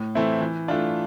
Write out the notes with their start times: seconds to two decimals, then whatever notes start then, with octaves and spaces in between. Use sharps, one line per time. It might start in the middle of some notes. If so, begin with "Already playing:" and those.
Already playing: A2
0.15 E3 A3 C4 E4
0.41 E3
0.68 A3 D4 F4